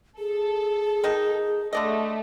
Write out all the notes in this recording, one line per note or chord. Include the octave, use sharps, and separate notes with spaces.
G#4 A4
D#3 D#4
D3 A3 D5 D#5